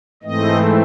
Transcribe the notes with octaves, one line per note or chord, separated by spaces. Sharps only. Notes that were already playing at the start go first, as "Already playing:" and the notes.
G#2 E3 A3 C4 D#5